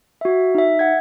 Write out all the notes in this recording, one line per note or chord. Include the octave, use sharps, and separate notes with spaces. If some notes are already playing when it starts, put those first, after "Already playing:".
F#4 E5
D#4 E5
F#5 G#6